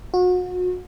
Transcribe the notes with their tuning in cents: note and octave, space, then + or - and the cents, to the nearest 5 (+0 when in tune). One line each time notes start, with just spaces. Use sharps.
F#4 -35